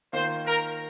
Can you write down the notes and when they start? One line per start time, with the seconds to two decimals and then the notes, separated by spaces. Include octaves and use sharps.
0.13 D#3 A#3 F4 C5
0.46 A#4